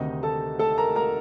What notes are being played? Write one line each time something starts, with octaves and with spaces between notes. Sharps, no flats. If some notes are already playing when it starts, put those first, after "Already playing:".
Already playing: D2 C3 D#3 D#4 D#5
A4 A5
A4 A5
A#4 A#5
A#4 A#5